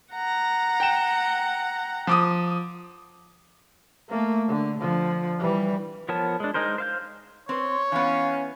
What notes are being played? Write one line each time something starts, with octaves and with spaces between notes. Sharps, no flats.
F#5 A#5
G5 E7
F3 D6 D#6
A3 A#3
D3
D3 F3
E3 G3
F3 B3 A#4 C#5 A5
G#3 D4
G#3 D#4 G#4 A#4 C5
C5 F5 G6
C4 B4 C#5 C6
E3 B3 C#4 F5